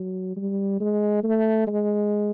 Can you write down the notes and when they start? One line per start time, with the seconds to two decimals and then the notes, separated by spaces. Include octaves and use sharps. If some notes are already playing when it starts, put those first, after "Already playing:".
Already playing: F#3
0.37 G3
0.80 G#3
1.24 A3
1.67 G#3